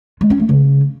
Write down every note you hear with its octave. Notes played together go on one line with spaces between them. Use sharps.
G#3
C#4
A3
C#3